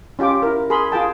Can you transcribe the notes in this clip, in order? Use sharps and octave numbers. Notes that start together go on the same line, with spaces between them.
C#4 F4 G4 G5 D6
E4 A#4
G#4 A#4 B5 C6
F4 G#4 G5 A5